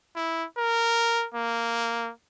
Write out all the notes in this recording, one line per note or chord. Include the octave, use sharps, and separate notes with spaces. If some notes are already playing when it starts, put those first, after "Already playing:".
E4
A#4
A#3